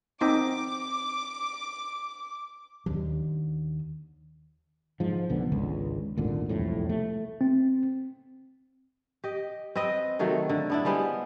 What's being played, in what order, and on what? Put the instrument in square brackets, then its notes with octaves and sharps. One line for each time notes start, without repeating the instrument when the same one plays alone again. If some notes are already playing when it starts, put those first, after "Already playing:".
[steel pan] C4 D#4 [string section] D6
[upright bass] D#2 D3
[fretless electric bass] G#2 F3
B1 D3 B3
G#1 C#2 D3
G#1 D2 A#2 D3
E1 C2 F2 A2
A3
[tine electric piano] C4
[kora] G4 D#5
C4 B4 D#5
C3 D#3 F#3 A3
D3
B3 D4 E4
G3 G#3 B3 C5